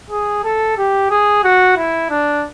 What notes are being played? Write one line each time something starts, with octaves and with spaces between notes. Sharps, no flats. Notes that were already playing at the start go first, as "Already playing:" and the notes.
G#4
A4
G4
G#4
F#4
E4
D4